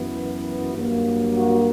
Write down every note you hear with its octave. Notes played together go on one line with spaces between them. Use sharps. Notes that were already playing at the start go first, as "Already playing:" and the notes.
Already playing: F#2 E3 B3
G2 F#3 A#3
F#4